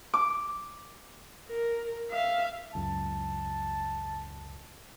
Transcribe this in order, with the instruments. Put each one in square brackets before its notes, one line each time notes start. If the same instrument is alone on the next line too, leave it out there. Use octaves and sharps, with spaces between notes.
[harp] D6
[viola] A#4
E5 F5
[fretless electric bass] C#2 F#2 [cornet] A5